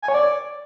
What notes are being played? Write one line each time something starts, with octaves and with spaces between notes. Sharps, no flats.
G#5
C#5
D5